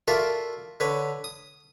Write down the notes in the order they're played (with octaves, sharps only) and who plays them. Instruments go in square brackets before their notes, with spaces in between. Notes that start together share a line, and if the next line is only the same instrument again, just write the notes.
[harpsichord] F4 F#4 A4 A#4 D5 E5
D3 B4 C#5
D#6